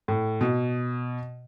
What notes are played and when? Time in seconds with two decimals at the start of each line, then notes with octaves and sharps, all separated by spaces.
0.08 A2
0.41 B2